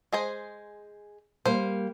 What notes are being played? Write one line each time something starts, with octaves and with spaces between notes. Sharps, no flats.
G#3 G#4 C5
G3 A#3 C5